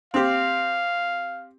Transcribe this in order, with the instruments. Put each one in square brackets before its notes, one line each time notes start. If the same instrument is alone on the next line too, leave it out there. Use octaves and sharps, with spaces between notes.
[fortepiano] C4 G4 [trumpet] F5